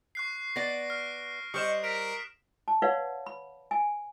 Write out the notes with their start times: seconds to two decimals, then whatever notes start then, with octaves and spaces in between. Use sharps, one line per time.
0.15 C#6 F#6 C7
0.56 B3 D5 A#6 C7 D7
0.90 F6
1.54 G3 C5 D#5 C#6 D#6 F6 E7
1.84 A#4 F6 B6 D7
2.68 A5
2.82 B4 C#5 D5 F5 F#5
3.26 B5
3.71 G#5